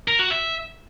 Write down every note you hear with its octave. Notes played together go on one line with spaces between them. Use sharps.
A#4
F#4
E5